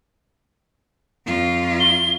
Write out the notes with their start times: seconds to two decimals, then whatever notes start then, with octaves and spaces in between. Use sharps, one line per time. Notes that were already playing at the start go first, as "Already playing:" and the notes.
1.26 F2 F4
1.80 G7